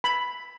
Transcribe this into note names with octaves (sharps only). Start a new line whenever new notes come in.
B5